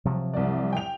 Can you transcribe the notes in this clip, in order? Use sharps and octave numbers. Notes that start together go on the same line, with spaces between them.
C3 F3 F#3
C2 D5
G5 F7